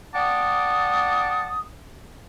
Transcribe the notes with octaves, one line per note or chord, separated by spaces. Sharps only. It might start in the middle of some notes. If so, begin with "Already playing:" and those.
D5 F#5 G5 A5 D6 D#6